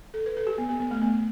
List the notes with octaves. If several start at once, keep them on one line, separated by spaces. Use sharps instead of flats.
A4
B4
A4
G4
B3
B3
B3
A3
B3